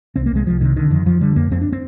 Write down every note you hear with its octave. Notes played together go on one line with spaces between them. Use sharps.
C2 C4
A#3
C2 G#3
C2 F3
C3 D#3
D3 D#3
F2 D#3
F2 F3
D3 G3
F2 A#3
F2 C4
D4
C4